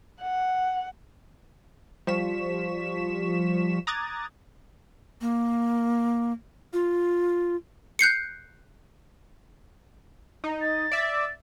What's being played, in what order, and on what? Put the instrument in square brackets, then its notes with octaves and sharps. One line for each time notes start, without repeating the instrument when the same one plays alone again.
[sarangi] F#5
[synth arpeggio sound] F3 G3 C#6 B6 E7
A#5 D6 D#6 F#6 G#6 A6
[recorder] A#3
F4
[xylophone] F#6 G6 C7 C#7
[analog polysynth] D#4
[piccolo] A6
[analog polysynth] D5 E5